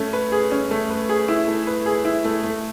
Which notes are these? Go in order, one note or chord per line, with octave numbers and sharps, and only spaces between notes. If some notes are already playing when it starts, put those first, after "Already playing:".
Already playing: A3 C#4
B4
G#4
C#4
A3
B4
G#4
E4
A3
B4
G#4
E4
A3
A3